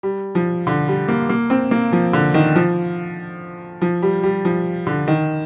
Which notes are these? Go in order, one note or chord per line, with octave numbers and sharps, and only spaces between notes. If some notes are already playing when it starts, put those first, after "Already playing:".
G3
F3
D3
G3
A#3
A#3
C4
A#3
F3
D3
D#3
F3
F3
G3
G3
F3
D3
D#3